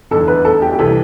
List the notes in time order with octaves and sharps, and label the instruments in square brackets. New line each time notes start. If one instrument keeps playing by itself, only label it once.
[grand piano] F1 E2 D3 [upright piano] A4
[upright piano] B4
A4
G4
G4
[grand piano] C2 C3 E3 [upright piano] A4